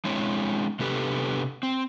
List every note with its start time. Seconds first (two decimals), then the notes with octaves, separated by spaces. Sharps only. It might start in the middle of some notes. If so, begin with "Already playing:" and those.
0.05 G#3 C4 D4 E4 C#5
0.79 C3 B3 D4 G4 A4 B4
1.63 C4